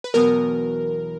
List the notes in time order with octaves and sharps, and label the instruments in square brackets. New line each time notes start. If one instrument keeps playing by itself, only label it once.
[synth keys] B4
[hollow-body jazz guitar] E2 B2 F#3 B3 [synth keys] A#4